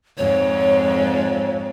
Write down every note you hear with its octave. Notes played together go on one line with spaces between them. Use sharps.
F2 G#2 C#5